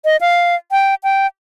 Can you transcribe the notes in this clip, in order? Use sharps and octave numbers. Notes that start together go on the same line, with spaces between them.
D#5
F5
G5
G5